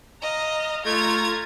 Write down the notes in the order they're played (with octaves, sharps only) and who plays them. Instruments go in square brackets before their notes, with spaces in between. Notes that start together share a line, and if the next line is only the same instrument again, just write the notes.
[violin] D#5 [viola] F5 A#5
[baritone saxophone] A3 [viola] F4 A#5 [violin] G#6